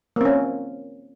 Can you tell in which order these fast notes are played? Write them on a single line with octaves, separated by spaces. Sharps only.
A#3 C4 C#4